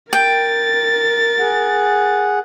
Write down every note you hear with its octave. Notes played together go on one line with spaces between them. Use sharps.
A#4 G5 A6
G#4 F#5